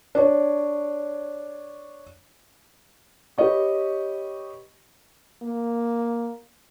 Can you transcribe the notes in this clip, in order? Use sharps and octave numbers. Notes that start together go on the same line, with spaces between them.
D4 C#5
G4 B4 C#5 D#5 C#6
A#3